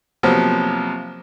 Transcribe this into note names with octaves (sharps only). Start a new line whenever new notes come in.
C3 F3 F#3 A#3 B3